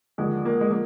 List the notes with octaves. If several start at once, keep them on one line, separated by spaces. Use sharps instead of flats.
D#2 D3 F3 G#3
A#3
G#3
F3 A#3